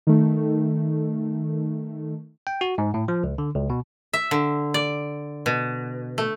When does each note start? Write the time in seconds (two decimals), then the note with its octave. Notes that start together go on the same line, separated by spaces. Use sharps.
0.07 D#3 A3
2.47 G5
2.61 F#4
2.78 G#2
2.94 A2
3.08 F3
3.24 C#2
3.38 D3
3.56 C#2
3.70 B2
4.13 E5
4.31 D3
4.74 D5
5.46 B2
6.18 A3